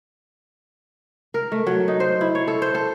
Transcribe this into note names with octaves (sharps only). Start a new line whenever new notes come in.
A#4
A3
F#3
D#4
C5
E4
C#5
A4
C5
A4